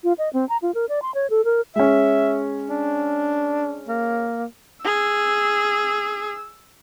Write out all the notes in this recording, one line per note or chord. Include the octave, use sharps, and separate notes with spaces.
F4
D#5
C4
A#5
F4
A#4
D5
C6
C#5
A4
A#4
G#3 C#4 E5
D4
A#3
G#4 E6